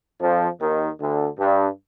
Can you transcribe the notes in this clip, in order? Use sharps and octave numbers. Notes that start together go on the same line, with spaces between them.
F2 F3
D#2 D#3
D2 D3
G2